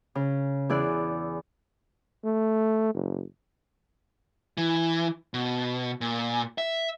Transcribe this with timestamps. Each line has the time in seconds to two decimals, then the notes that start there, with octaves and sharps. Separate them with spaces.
0.15 C#3
0.69 E2 E4 G#4 D5 F#6
2.24 A3
2.94 F#1
4.57 E3
5.34 B2
6.01 A#2
6.58 E5